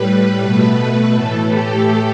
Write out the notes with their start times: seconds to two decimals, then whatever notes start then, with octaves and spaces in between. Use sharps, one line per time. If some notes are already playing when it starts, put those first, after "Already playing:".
Already playing: A2 G3 B4
0.41 B2 A3
1.14 A2 E3 A3 A4
1.51 G4